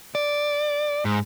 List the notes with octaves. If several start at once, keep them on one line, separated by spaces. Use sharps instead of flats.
D5
G#2